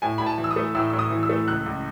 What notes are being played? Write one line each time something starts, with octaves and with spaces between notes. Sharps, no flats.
A2 G#5
A2 B5
A5
E3
E6
D#6
A3
A2 E6
A2 E6
D#6
E3
E6
A3
C#2 F#6
C#2